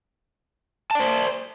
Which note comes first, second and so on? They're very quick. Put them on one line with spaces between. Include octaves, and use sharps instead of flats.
A5 D5 C5